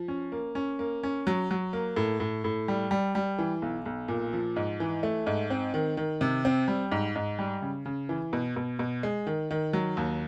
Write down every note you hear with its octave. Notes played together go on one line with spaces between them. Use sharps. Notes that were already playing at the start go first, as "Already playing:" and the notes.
Already playing: F3
C#4
A#3
C#4
A#3
C#4
F#3
F#3
A#3
A2
A2
A2
G3
G3
G3
E3
B1
B1
A#2
F3
G#2
E3
A3
G#2
C4
D#3
D#3
C3
C4
G3
G#2
G#2
G3
C#3
C#3
E3
B2
B2
B2
G#3
D#3
D#3
F#3
D#2